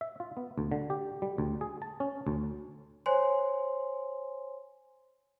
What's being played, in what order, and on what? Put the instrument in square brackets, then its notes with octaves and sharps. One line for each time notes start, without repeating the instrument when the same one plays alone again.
[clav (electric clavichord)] E5
F4
B3
D2
D3
G4
G3
D2
G#4
A5
C#4
D2
[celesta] C5 C#5 G#5 C6